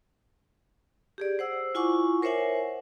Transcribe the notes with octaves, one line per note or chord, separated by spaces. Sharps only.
G4 G#4 D5
C5 F#5 E6
E4 F4 F#5 G#5 C#6 D6
A#4 C5 C#5 E5 F#5 G#5